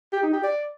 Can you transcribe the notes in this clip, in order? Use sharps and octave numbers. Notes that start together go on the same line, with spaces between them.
G4
D#4
G4
D5